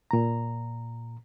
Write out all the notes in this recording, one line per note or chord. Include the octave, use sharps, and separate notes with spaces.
A#2 A#5